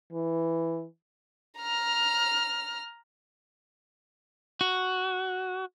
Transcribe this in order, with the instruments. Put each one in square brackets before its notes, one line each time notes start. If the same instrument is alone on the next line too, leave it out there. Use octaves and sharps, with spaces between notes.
[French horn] E3
[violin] A#5 F6
[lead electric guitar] F#4